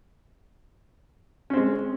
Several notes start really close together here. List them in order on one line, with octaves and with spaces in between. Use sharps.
C#4 C4 G#3